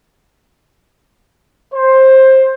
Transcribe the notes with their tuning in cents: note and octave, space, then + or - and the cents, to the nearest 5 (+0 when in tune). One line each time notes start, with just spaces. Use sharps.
C5 +15